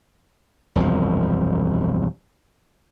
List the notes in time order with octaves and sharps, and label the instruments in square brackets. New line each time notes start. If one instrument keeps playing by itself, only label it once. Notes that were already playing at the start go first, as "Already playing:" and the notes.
[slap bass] E1 C2 F#2 F3